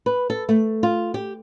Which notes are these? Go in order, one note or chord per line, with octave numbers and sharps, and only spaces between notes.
B4
A4
A3
F4
G4